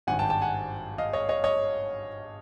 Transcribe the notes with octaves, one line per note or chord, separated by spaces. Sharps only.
G#1 G2 D#3 F#5 G#5
G5 A5
G5 A5
F#5 G#5
D#5 F5
C#5 D#5
C#5 D#5
C#5 D#5